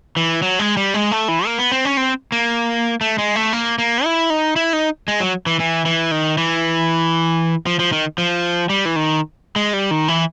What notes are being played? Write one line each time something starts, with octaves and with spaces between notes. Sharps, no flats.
E3
F#3
G#3
G3
G#3
A3
E3
A#3
B3
C4
C#4
C4
A#3
A3
G#3
A3
A#3
A#3
E4
D#4
E4
D#4
G#3
F#3
E3
E3
E3
D#3
E3
F3
F3
D#3
F3
G3
E3
D#3
G#3
G3
D#3
E3